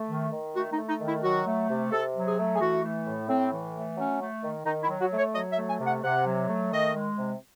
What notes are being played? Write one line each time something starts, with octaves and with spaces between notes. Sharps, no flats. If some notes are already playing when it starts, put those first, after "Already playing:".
Already playing: A3
D#3
D#3
A3 F#4
D#4
A3
D#4
D#3
E4
F#3 F#4
A3
C3
C3 A4
F#3
G#4
A3
G#4
E3 F#4
A3
A2
A2 C4
E3
A3
F#3 C#4
A3
D#3
D#3 D#4
E4
F#3
F#4
A3
C#5
F#3 D#5
E5
A3
G#5
C3
F#5
C3 F#5
F#3
A3
D#3 D#5
G#3
C3